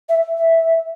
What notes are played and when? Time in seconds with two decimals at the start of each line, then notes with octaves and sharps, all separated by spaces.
0.09 E5
0.38 E5